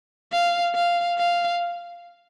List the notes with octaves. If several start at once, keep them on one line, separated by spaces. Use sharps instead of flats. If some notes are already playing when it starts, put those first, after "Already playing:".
F5
F5
F5